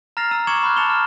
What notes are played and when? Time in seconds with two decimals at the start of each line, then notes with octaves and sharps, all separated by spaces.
0.17 A#5 F6 A6 A#6 C7 F7
0.31 A#5 E6 D#7
0.47 C#6 D6 G#6 C#7 E7 F#7
0.62 A#5 B5 D6 F6 F#6
0.76 A5 A6 C#7 E7 F7 G7
0.90 F6